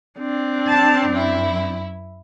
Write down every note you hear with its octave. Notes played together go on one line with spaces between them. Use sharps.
C4 D4
A5
F#2 E4